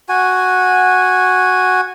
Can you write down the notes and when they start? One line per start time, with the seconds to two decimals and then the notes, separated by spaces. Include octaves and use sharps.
0.09 F#4 G#5